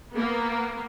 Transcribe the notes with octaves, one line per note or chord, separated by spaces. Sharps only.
A#3 B3